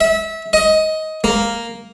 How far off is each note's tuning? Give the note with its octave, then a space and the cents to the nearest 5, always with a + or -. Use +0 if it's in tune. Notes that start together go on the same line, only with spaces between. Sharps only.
E5 -25
D#5 +15
A#3 +0